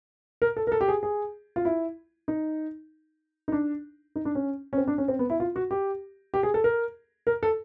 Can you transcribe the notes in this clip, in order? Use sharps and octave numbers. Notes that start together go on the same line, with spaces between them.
A#4
A4
A#4
A4
G4
G#4
G#4
F4
E4
D#4
D#4
D4
D#4
D4
C#4
C#4
C4
D4
C#4
C4
B3
E4
F4
F#4
G4
G4
G#4
A4
A#4
A#4
A4